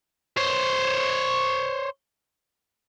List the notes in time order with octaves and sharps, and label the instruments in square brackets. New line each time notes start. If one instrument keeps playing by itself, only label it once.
[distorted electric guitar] C5 C#5